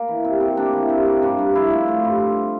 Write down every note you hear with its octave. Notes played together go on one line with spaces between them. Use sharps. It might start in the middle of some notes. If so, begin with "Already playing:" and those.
Already playing: A#3
E3
C3
C3
A#3 D4
E3
C3
A#3
G2 D4
G2
F3 E4
A3
A3 F4
G2
F3